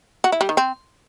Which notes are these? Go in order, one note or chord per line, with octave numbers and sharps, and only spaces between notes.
F#4
E4
G3
D#3
C4